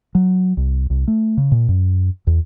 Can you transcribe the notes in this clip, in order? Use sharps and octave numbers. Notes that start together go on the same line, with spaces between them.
F#3
C2
C2
A3
C#3
A#2
F#2
E2